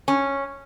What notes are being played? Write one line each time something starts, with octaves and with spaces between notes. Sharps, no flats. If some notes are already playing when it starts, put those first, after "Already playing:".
C#4